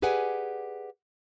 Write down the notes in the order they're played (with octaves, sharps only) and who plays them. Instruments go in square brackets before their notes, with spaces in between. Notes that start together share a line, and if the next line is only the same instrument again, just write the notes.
[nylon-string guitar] G4 G#4 B4 D5 F#5 G#5